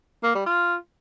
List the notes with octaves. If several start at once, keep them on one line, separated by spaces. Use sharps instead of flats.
A#3
G3
F4